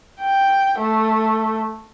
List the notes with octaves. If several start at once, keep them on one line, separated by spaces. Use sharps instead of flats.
G5
A3